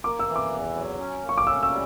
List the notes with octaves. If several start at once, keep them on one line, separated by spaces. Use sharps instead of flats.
A#3 D6
E6
E3
D6
E2
F#3
C#4
A#3
C#6
D6
C#4 E6
E6
G3